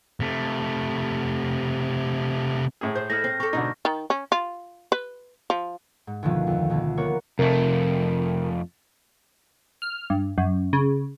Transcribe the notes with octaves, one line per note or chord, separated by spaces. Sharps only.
C3 A3
A2 G#4
C5 G6
A3 D#4 E4 F6 A#6
C4
G4 A4 C#6
D2 G#2 B2 D3 D#4
D#3
C#4
F4
B4
F3
G#2
D2 B2 D3 D#3 F3
F2
D2 B2
A#3 B3 A#4 C#5 F#5
F2 C3 A3 A#4
F6
G2
F#2
C#3